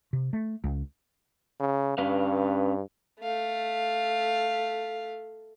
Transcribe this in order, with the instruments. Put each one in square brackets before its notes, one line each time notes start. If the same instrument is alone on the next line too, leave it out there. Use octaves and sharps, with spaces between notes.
[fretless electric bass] C3
A3
C#2
[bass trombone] C#3
[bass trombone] G2 [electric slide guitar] C#4 B4 F5
[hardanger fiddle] A3 F5